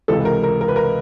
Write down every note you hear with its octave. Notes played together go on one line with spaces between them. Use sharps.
C#2 C3 E3 A4
A#4
A#4
A#4
B4
A#4